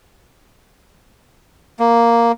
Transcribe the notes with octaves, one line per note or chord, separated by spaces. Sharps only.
A#3